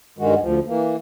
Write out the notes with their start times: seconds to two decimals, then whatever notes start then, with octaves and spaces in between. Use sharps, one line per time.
0.18 G2 D#3 G#3 F#4
0.41 D2 F3
0.66 E3 A#3